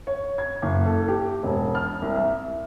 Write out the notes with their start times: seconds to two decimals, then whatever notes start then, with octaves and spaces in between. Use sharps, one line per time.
0.07 C#5
0.38 G#6
0.62 F#1
0.86 A4
1.08 G4
1.43 E1
1.75 F6
2.02 C2
2.16 E5